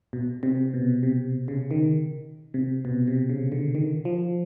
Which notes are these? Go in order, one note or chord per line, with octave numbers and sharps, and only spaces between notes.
B2
C3
B2
C3
C#3
D#3
C3
B2
C3
C#3
D3
D#3
F3